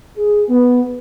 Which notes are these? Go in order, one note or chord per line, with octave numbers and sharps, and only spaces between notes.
G#4
B3